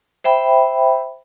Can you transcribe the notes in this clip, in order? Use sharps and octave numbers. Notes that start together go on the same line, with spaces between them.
C5 E5 G5 B5